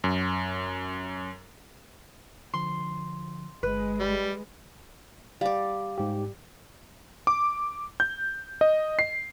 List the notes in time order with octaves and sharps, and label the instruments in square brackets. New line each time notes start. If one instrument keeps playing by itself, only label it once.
[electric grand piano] F#2
[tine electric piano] D3 F3 [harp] C6
[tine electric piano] G1 [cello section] G#3 [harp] B4
[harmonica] G3
[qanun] G3 D5 [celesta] F5
[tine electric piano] G#2 G4
[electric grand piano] D6
G6
D#5
C7